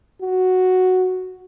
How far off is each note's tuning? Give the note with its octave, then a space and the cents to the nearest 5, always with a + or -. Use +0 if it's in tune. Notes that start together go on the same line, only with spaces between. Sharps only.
F#4 +0